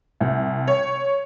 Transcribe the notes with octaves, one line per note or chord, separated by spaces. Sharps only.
C2
C#5